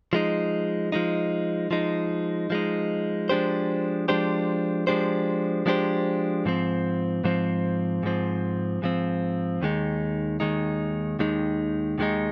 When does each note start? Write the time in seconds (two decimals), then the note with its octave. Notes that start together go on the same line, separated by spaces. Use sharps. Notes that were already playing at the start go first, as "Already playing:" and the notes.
0.13 F3 G#3 D#4
0.92 F3 G#3 D#4
1.71 F3 G#3 D#4
2.50 F3 G#3 D#4
3.29 F3 G#3 D4 G4 C5
4.08 F3 G#3 D4 G4 C5
4.87 F3 G#3 D4 G4 C5
5.66 F3 G#3 D4 G4 C5
6.45 G#2 F3 C4
7.24 G#2 F3 C4
8.03 G#2 F3 C4
8.82 G#2 F3 C4
9.62 D#2 D#3 G#3 D#4
10.40 D#2 D#3 G#3 D#4
11.19 D#2 D#3 G#3 D#4
11.98 D#2 D#3 G#3 D#4